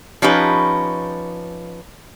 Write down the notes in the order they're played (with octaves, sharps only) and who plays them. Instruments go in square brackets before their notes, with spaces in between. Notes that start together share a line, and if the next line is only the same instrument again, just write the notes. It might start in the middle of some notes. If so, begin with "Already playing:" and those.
[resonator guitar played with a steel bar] F3 C#4 D#4 G4 B4